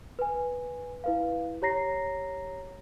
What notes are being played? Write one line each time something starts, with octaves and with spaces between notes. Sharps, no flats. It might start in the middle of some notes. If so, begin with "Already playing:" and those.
B4 G#5
E4 B4 F5
G4 C#5 A#5 A#6 C7